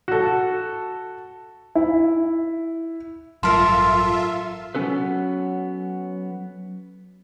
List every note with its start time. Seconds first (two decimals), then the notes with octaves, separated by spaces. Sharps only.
0.08 F#4 A4
1.75 E4
3.43 A1 G2 F#3 F4 A4 A#4 E5 C6
4.75 F#3 A#3 B3 C#4 A4 B4